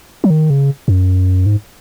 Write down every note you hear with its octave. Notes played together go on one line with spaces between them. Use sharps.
F#3
D#3
C#3
F#2
G#2